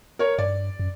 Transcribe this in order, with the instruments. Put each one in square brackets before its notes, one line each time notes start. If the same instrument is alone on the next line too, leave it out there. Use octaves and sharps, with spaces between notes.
[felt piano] A#4 C#5
[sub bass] G2 [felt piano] D5
[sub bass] F#2